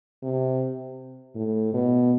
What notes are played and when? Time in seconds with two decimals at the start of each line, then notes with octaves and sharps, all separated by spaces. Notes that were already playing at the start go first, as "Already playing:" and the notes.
0.22 C3
1.35 A2
1.74 B2